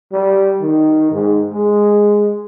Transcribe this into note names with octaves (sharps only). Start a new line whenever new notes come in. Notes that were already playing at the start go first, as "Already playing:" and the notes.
G3
D#3
G#2
G#3